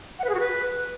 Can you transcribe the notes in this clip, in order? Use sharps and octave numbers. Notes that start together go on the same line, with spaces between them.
F#5
B4
G#4
F#4
B4